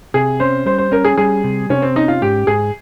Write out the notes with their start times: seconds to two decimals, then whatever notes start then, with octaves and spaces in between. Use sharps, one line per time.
0.14 C3 G#4
0.40 C#4 C5
0.66 G3 C5
0.78 C5
0.92 C#4 A#4
1.05 G#4
1.18 G3 G#4
1.44 C3
1.70 C3 C#4
1.82 C4
1.96 C#4 D#4
2.08 F4
2.22 G#2 G4
2.47 G#2 G#4